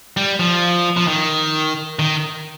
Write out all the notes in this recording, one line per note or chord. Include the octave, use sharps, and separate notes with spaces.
G3
F3
F3
D#3
D#3